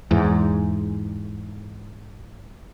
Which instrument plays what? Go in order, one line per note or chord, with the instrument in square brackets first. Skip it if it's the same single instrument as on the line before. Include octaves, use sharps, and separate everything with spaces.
[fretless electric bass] E2 G#2